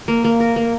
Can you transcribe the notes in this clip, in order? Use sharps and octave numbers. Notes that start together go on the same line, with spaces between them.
A#3
A#3
A#4
A#3